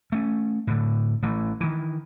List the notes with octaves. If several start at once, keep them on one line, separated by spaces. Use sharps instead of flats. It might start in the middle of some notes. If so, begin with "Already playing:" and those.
A3 C#4
A2 D3
A1 E3 A3
D#3 E3